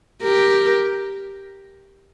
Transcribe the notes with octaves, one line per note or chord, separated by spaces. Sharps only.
G4 A#4